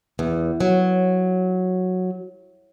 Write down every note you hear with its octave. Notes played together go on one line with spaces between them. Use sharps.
E2
F#3